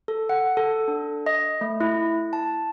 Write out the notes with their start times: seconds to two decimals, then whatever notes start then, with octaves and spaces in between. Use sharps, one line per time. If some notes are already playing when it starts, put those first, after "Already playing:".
0.08 A4
0.29 F#5
0.57 A4
0.88 D4
1.26 D#5
1.61 A3
1.80 E4
2.33 A5